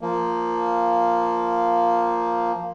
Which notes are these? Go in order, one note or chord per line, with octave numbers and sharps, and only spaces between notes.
F3 A#3